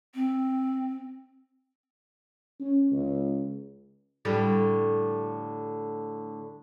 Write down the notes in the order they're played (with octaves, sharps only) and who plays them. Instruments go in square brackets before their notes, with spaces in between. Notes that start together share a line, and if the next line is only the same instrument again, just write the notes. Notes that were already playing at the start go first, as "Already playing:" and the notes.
[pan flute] C4
[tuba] C#4
C#2
[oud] A2 D3 G3